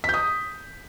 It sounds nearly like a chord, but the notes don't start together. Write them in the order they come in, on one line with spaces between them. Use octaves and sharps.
B6 G6 D#6